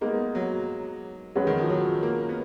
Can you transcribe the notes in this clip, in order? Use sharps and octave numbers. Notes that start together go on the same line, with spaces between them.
G#3 A#3 B3 D#4
F#3
F#3 G#3 C#4 F#4 B4
D#3
F3
F#3
A#3
B3